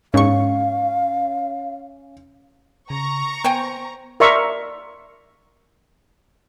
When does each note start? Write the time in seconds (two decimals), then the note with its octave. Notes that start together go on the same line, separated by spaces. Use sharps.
0.14 G#2 C#4 F5 C#6
2.90 C#3 A#5 C#6
3.44 B3 C5 G5 G#5
4.20 A#4 D5 E5 A#5 C6 C#6